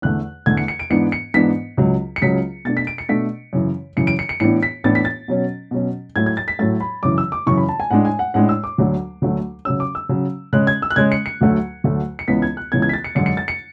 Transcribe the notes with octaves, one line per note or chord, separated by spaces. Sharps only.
E2 D3 A3 F#6
E2 D3 A3 G#6
C#7
C#7
D7
G#2 E3 B3 D4 C#7
C#7
G#2 E3 B3 D4 B6
C#2 C#3 F#3
C#7
C#2 C#3 F#3 B6
B2 A3 D4 A6
B6
D7
C#7
B2 A3 D4 B6
F#2 C#3 E3
F#2 C#3 E3 C#7
D7
C#7
C#7
A2 E3 B3 D4 C#7
B6
A2 E3 B3 D4 A6
B6
A6
B2 F#3 C#4
B2 F#3 C#4
A2 F#3 A3 G#6
G#6
A6
B6
A2 F#3 A3 A6
B5
F#2 C#3 E3 D6
E6
D6
F#2 C#3 E3 C#6
B5
A5
G#5
A2 G#3 D4 F#5
G#5
F#5
A2 G#3 D4 F#5
E6
D6
D2 D3 F#3 A3 D4
D2 D3 F#3 A3 D4
C#3 F#3 C#4 E6
D6
E6
C#3 F#3 C#4
C#3 G#3 C#4 F#6
G#6
E6
F#6
C#3 G#3 C#4 G#6
C#7
C#7
D2 D3 F#3 A3
D2 D3 F#3 A3
C#7
C#2 C#3 E3 B3 B6
G#6
F#6
C#2 C#3 E3 B3 G#6
G#6
B6
A6
C#7
F#2 D3 G#3 C#7
C#7
A6
C#7